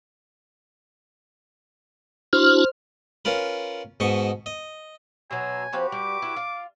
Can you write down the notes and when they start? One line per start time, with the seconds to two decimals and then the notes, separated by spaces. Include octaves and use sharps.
2.33 D4 E4 F#4 C5 F6
3.25 C#4 F4 A#4 B4
4.00 G#2 B2 D#5 C#6
4.46 D#5
5.31 B2 F#3 G#5 A#5 C6 E6
5.73 F3 C4 F#4 G4 B4 F5
5.92 G3 D6
6.22 E4
6.36 F4 F5